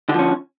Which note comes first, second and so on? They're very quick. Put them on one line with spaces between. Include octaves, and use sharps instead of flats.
D3 F3 C#4